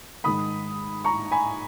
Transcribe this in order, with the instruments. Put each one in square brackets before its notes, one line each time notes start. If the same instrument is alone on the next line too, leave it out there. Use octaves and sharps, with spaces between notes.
[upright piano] G#2 D#3 G#3 B5 D#6
A#5 C#6
G#5 B5